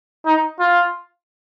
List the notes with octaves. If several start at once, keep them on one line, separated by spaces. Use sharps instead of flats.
D#4
F4